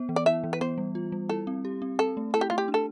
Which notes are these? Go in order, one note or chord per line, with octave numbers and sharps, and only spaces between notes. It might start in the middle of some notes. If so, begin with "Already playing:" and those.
Already playing: B3 C5
E3
D5
E4 E5
E3
B4
B3 C5
G3
F4
G3
E4 A4
C4
G4
C4
C4 A4
A3
E4 A4
G4
A3 F4
G4
D4
A4